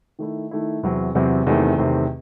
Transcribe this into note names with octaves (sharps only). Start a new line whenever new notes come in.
D#3 A3 E4
D#3 A3 E4
E2 C3 F#3 C4
E2 C3 F#3 C4
E2 C3 D#3 A3 C4
E2 C3 D#3 A3 C4